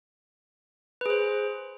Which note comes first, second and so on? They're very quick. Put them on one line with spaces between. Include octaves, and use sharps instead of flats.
B4 G#4 C5